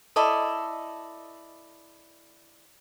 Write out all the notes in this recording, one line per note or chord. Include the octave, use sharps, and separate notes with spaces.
E4 A4 D5 D#5